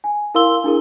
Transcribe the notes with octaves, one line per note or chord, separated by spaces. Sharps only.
G#5
E4 A#4 F5 C6 E6 G7
D4 E4 G#4 A#4